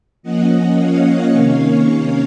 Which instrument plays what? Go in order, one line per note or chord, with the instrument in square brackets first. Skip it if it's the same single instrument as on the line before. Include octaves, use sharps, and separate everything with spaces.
[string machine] F3 A#3 C#4 D#5 F#5
C#5 F5
C3 D#3 A#3 C#4